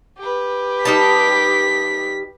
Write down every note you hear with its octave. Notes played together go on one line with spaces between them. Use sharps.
G4 B4
G3 D#4 A5 B6